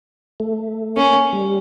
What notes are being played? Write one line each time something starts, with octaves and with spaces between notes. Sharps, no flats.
A3
A#3 C#4
G3